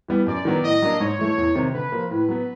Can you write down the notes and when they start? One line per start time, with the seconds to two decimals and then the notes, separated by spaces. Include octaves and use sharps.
0.08 E3 G3 B3
0.27 F#2 D5
0.45 D#3 F#3 B3
0.64 A2 D#5
0.82 F#3 A#3 D4
1.00 G#2 C#5
1.19 E3 A3
1.38 E2
1.55 C3 D#3
1.74 D3 B4
1.92 F3 A#3
2.10 A2 B4
2.29 F#3 B3